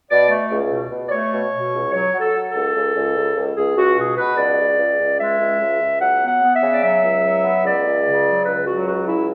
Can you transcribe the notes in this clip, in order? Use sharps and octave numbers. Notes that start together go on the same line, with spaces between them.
B2 D5
A3
C#2
B2
B2
D5
A3 C#5
B2
B2
C#2
F#3 C#5
F#3
A4
F#3
A4
C#2
C#2
C#2
C#2
C#2
C#2 G#4
C#2 F#4
B2 G#4
B2 B4
C#2 D5
C#2
C#2
C#2
G#3 E5
C#2
C#2
C#2
F#3 F#5
B3
F#5
B3
E5
C#3
D5
F#3 E5
C#2
F#3
B3
C#2 D5
C#2
C#3
F#3
C#2 B4
F#3 F#4
C#2 F#4
C#3 E4